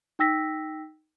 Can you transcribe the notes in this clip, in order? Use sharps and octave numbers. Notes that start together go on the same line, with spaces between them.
D#4 G5 E6 A#6 B6